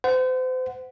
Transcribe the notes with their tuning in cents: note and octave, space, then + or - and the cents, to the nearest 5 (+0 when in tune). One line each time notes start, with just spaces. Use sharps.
C5 -35 F#5 +0